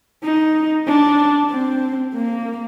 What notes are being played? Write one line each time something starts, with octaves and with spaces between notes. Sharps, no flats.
D#4
D4
C4
A#3